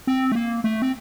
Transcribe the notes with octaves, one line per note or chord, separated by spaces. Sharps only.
C4
A3
A#3
A3
C4